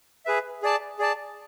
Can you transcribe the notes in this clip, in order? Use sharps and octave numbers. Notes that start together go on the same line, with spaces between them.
G#4 B4 E5
G#4 D5 A5
G#4 D5 A5